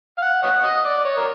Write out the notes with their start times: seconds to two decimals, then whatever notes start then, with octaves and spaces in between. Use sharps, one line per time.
0.18 F5
0.22 F#5
0.43 C#5 D#5 F#5
0.63 D#5
0.84 D5
1.05 C#5
1.17 A#4